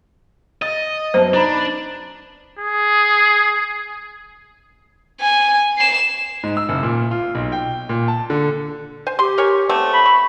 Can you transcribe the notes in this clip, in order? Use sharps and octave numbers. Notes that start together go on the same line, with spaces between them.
D#5 D#6 A6
F#2 B3 C5 A5
D4 D#4 A#5 B5
G#4
G#5
C7 E7
G#2
E6
F#1
A#2
F4
B1
G5
A#2
A5
D3
C5 G#5
G4 C6
A#4 C#5 G#5
A3 B3 C4
B5
C#6